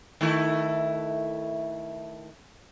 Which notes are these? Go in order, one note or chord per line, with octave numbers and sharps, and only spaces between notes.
D#3 A3 E4